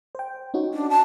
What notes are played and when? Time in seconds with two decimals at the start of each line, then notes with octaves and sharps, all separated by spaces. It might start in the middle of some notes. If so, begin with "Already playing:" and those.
0.15 C5 G5
0.54 C#4 D#4 F#4
0.74 D4
0.90 A5